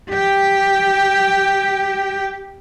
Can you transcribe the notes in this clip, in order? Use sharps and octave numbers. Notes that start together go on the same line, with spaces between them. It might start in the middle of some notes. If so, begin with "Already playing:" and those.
G4 G5